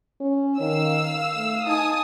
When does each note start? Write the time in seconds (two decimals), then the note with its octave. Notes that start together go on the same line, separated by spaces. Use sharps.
0.21 C#4
0.60 D#3 F5 E6
1.37 A3
1.67 D#4 G#5 A5 D#6